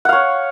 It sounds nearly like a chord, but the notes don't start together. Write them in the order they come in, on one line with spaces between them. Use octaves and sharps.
F#5 F5 C#5